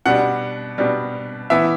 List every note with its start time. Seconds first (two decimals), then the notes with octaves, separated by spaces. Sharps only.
0.06 B2 G3 D4 F#5
0.78 B2 G3 D4
1.50 E3 B3 E4 E5